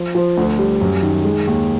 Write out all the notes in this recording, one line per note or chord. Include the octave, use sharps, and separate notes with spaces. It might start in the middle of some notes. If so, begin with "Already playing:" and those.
Already playing: F3
F3
D2
G3
F#2
D#3
G#3
D#2